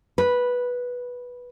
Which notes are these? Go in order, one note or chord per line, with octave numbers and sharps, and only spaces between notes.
B4